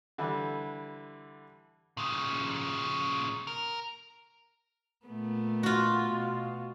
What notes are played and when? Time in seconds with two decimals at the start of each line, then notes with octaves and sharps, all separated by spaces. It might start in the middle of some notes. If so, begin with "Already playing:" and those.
0.18 D3 E3 G3
1.97 A#2 C#3
3.47 A#4
5.06 A#2 A3 B3
5.63 F4 F#4
6.08 B2